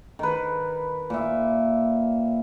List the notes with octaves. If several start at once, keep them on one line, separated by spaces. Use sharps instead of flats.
D#3 B4
A#2 E5